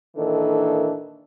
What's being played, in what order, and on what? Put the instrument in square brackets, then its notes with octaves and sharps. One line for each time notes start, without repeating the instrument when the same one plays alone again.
[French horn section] A#2 D#3 E3 D4 D#4 A4